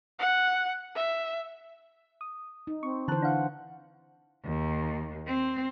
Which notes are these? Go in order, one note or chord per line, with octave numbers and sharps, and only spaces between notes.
F#5
E5
D#6
D#4
C4 C#6
D3 E3 C5 A5 F#6
D4 F5 F#5
D#2
C4